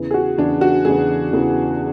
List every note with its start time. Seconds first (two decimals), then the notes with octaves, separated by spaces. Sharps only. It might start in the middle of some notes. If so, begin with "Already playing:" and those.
Already playing: E2 C#3 E3
0.11 G#4
0.14 F#4
0.38 E2 C#3 E3 D4
0.61 F#4
0.85 E2 C#3 E3 G#4
1.33 E2 C#3 E3